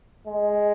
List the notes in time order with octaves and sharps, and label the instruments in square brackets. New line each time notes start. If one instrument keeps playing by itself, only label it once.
[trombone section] G#3